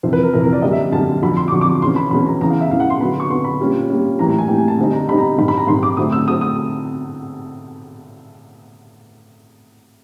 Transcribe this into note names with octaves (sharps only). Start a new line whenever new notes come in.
F2 C3 E3 C5
B4
A#4
F2 C3 E3 A#4
A#4
D5
F#2 D3 G3 A#3 D#5
E5
F#2 D3 G3 A#3 A5
F2 D3 F#3 B5
C6
D6
F2 D3 F#3 C#6
D6
E2 B2 G#3 C#4 C6
B5
E2 B2 G#3 C#4 B5
A#5
E2 C#3 E3 A#5
F5
E5
E2 C#3 E3 F5
F#5
C6
D3 F#3 B3 B5
C#6
D3 F#3 B3 C6
B5
A#2 G3 A#3 C#4
A#2 G3 A#3 C#4
A2 E3 G3 A#3 A#5
A#5
G#5
A2 E3 G3 A#3 G5
G#5
A5
D3 G3 C4 D#4
A#5
D3 G3 C4 D#4 B5
A#5
G#2 D#3 G3 B5
B5
A#5
G#2 D#3 G3 C6
D6
D3 F#3 A3 C4 D#6
E6
D3 F#3 A3 C4 D#6
D#6